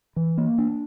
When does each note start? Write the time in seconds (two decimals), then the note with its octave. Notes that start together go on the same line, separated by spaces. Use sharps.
0.16 E3
0.38 A#3
0.58 D4